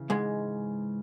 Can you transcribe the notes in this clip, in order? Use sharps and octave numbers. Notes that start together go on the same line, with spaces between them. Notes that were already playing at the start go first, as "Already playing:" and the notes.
Already playing: C#3 E3
G#2 G#3